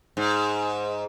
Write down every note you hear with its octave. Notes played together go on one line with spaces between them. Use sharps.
G#2